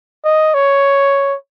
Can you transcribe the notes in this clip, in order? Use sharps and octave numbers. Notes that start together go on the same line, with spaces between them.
D#5
C#5